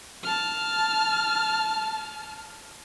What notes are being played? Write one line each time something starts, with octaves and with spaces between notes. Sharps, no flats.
A5 F6